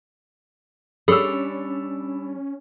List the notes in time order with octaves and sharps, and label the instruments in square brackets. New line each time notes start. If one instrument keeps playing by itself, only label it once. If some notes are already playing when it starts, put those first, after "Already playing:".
[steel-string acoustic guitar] G3 D4 C#5 [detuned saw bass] C#4 [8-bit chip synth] G#4 A4 [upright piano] B5 E6